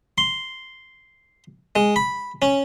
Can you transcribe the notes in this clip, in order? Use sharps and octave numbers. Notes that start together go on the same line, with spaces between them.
C6
G#3
B5
C#4